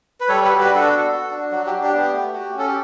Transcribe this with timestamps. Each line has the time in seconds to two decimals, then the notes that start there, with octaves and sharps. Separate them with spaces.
0.20 B4
0.29 G3 A4 C#5
0.44 F#4 G4 B4
0.60 G4 B4
0.70 D4
0.75 F#4 A4
0.91 B3
1.11 F#4
1.31 D4
1.51 F#3 F#4
1.66 G4
1.72 D4
1.83 G4
1.93 B3 G4
2.13 A3
2.34 F#4
2.54 C#4
2.59 A4
2.67 G4